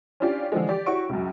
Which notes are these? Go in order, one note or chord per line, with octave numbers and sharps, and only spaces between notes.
C#4 D4 E4 F4 G4 D5
D3 E3 F3 G#3
G4 D5
E4 F#4 G4 C#5 C#6 D7
C#2 F#2